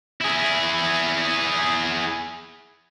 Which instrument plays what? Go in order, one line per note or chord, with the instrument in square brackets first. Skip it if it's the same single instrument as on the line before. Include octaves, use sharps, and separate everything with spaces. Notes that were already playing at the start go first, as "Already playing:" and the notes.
[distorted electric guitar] E4 G#4